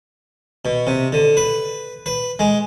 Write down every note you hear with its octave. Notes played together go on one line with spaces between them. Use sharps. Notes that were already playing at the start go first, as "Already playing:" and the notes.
B2
C3
D3
B4
B4
G#3